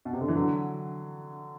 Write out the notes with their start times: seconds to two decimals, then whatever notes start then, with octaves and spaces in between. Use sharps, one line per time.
0.05 B2
0.13 C3
0.21 D3
0.28 E3
0.35 D3 F#3